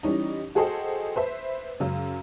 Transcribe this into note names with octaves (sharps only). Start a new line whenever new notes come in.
E3 G3 C#4 D#4
F#4 G#4 A4 C5 D#5 G5
B4 C5 E5
F#2 C#3